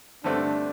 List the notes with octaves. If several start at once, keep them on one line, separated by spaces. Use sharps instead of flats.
G2 D3 A3 C4 D4